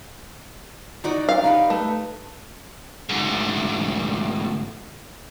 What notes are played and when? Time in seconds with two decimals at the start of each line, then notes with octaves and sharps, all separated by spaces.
1.04 D#4 F#4 D5
1.29 F5
1.44 D#4 G4 B4
1.70 A3
3.09 D2 G#2